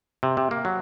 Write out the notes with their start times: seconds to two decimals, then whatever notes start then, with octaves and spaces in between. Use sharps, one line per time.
0.23 C3
0.37 C3
0.51 A#3
0.65 F#3